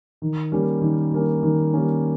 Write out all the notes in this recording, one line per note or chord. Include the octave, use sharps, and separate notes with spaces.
D#3
G3 A#3 C#4
D#3
G3 A#3 C#4
D#3
G3 A#3 C#4